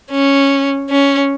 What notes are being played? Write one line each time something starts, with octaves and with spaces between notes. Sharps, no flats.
C#4
C#4